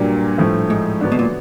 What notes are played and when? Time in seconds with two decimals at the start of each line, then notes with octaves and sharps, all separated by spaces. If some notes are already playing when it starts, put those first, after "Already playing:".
Already playing: G2 A#2 F#3 A#3 D4 G4
0.38 A2 F3 A3 C4 E4
0.70 G#2
1.01 D3 F#3 B3 D4
1.12 B2
1.19 A#2